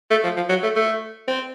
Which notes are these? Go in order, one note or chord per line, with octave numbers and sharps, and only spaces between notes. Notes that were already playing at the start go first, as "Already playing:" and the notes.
A3
F3
F3
F#3
A3
A3
C4